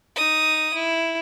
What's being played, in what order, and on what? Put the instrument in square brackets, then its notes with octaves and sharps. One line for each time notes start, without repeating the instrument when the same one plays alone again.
[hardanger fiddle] D#4 D#6
E4